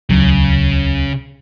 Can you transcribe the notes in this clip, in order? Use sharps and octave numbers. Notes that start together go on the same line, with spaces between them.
D#1 C#2 C#3 F#3